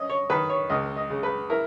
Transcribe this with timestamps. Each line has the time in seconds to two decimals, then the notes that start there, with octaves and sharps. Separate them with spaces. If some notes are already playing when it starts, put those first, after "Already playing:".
Already playing: C#4 D#5
0.09 C#5
0.30 D#3 B4
0.50 C#5
0.69 C#2 D#5
0.96 D#5
1.10 C#3
1.23 B4
1.50 E4 A#4